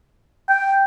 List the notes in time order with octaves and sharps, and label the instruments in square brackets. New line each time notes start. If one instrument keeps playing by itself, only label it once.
[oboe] G5